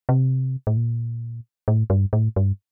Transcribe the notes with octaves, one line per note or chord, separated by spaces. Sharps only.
C3
A2
A#2
A2
G2
A2
G2